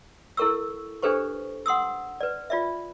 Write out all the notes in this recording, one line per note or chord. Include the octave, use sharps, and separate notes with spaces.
E4 A4 A#4 C#6 E6
D4 G4 A4 B4 C5 C#6
F#5 C6 D#6 E6
B4 D5
F4 D5 E5